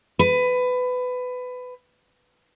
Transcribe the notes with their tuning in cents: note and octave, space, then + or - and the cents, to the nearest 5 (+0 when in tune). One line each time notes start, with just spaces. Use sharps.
B4 +20